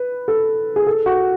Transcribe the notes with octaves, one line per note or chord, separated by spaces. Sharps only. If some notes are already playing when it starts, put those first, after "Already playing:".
Already playing: B4
A4
G#4
A4
F#4